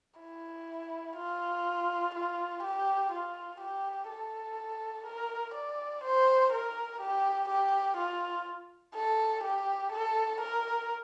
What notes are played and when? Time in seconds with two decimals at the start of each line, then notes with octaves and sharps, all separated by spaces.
0.20 E4
1.17 F4
2.15 F4
2.63 G4
3.12 F4
3.61 G4
4.09 A4
5.07 A#4
5.54 D5
6.04 C5
6.52 A#4
7.01 G4
7.49 G4
7.98 F4
8.95 A4
9.44 G4
9.92 A4
10.41 A#4